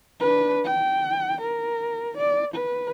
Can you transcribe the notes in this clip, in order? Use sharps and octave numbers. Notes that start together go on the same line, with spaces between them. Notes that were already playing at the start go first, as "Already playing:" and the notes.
D4 B4
G5
A#4
D5
B4